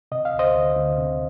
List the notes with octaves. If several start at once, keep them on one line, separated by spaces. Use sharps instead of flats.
C3 D#5
F5
D2
C5 D#5
D2
D2
C3